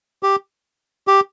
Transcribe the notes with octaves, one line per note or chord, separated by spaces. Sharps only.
G4
G4